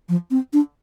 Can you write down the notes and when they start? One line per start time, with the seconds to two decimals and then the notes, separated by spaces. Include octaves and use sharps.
0.09 F3
0.31 C4
0.53 D4